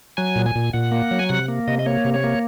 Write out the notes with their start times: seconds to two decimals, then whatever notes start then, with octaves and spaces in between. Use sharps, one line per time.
0.17 F#3 G#5
0.36 A#2
0.46 G#5
0.55 A#2
0.73 A#2 F#5
0.92 A#3
1.11 F#3
1.19 G#5
1.29 C3 F#5
1.48 A#3
1.67 C3 D#5
1.79 D#5
1.86 A#3 C#5
2.05 C3
2.14 C#5
2.24 A#3